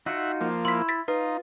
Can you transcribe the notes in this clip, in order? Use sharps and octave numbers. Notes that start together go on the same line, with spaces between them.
D#4 F4 F#4 E5 F#5
F3 A#3
E4 C6 B6
A6 B6
D#4 F4 B4